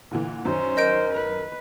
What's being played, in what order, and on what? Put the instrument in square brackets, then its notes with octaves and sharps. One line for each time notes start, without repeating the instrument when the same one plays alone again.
[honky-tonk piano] A#2 D3 E3
[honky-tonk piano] F#2 D#3 [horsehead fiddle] C#4 C5
[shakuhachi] A#4 [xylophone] D#5 G6 D7
[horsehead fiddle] B4